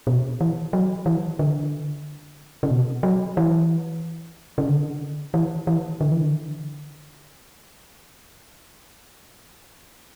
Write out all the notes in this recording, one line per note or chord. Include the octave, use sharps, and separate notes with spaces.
B2
E3
F#3
E3
D3
C#3
B2
F#3
E3
C#3
D3
E3
E3
D3
E3
D3